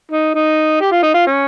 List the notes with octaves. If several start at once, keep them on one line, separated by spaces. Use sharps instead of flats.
D#4
D#4
G4
F4
D#4
F4
C#4